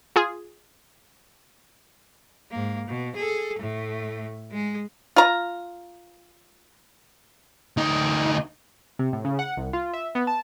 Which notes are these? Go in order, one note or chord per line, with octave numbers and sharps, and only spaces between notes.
F4 G#4
G#2 A#3
B2
G#4 A4
A2 A3
G#3 G#4
F4 A#5
D2 D#4
C3
A2
C#3
F#5
C2
F4
E5
B3
A5